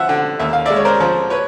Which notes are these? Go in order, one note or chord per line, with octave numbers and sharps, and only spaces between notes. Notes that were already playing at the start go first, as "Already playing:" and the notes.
Already playing: F3 E5 F#5
D3
D#2 E5
F5
G#3 D5 E5
C#5
A#4 C5
F3
B4 C#5